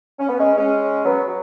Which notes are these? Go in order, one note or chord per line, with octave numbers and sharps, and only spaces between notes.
C#4
B3
G#3 C#4
G#3 C#4
F#3 B3
F#3